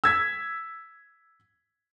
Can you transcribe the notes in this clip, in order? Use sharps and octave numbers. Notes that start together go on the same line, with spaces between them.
E6 G#6 B6